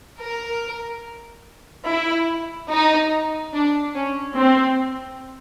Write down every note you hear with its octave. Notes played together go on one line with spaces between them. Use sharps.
A#4
E4
D#4
D4
C#4
C4